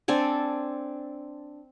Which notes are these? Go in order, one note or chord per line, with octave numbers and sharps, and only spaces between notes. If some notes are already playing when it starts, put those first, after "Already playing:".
C4 D4 A4 G#5